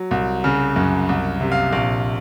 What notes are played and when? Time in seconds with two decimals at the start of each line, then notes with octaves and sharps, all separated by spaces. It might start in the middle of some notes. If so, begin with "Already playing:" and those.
Already playing: F#3
0.11 C2
0.44 C#3
0.76 F#2
1.09 C2
1.41 C3
1.52 F5
1.72 A#1 F5